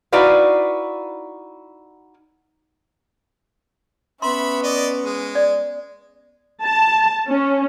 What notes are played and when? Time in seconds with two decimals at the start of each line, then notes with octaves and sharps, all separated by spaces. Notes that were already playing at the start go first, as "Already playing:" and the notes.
0.12 D#4 E4 F#4 B4 D5 F5
4.22 B3 C#4 E5 B5 C6
4.63 D5 D#5
5.04 G#3
5.35 D5
6.63 A5
7.29 C#4